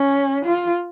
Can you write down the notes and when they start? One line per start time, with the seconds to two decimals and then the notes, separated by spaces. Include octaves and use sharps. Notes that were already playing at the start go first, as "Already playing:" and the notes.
Already playing: C#4
0.45 F4